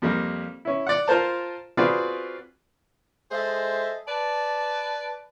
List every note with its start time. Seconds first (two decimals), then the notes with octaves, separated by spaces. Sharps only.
0.02 F2 G3 A#3
0.65 C#4 E4
0.87 D5 F#5
1.08 F4 A#4 C5 A5
1.77 C4 F4 F#4 G#4 B4 D5
3.32 G#3 G#4 A4 C5 D#5 E5
4.07 B4 D5 A5